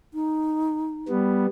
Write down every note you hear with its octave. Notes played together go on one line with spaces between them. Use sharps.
D#4
G3 B3